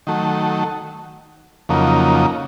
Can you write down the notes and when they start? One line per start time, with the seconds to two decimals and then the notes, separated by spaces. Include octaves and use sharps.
0.07 D#3 F#3 A3
1.69 F2 C#3 F#3 A#3 D#4